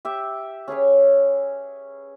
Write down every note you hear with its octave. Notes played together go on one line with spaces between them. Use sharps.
G4 E5
C#4 G#4 B4 C#5